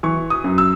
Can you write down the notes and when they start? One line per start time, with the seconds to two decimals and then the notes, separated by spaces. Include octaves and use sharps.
0.03 E3 C#6
0.30 D#6
0.44 F#2
0.58 E6